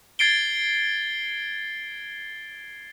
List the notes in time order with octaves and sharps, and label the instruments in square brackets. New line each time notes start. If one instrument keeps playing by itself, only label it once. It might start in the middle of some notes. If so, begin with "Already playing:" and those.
[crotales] G#6 A6 C7 D7 G7